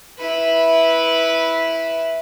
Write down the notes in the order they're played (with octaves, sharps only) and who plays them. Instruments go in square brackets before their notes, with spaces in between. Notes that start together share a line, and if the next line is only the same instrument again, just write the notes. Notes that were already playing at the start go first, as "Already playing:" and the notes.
[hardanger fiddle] E4 B4